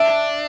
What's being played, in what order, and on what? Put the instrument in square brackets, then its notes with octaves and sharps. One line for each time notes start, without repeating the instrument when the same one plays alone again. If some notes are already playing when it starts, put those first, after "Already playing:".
Already playing: [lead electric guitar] D4 [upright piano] E5